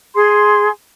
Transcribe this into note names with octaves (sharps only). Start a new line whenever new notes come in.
G#4 C6